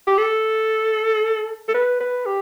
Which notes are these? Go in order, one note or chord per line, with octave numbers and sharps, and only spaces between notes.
G4
A4
A4
B4
B4
G4